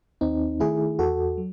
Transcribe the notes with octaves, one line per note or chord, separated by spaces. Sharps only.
D#2 C4 D#4
D#3 A3 E4 G#4
E2 F#4 A4
F#3